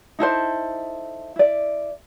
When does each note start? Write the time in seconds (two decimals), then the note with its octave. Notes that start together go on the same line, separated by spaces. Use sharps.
0.19 D#4 E4 A4 C5
1.36 E4 D5